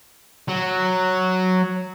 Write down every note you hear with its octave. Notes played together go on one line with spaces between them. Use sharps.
F#3